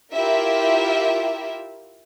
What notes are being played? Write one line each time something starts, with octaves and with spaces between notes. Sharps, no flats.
E4 F4 G4 A#4 E5